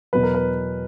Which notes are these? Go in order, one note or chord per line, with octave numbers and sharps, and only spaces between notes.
E2 B2 F#3 B4
A#4
B4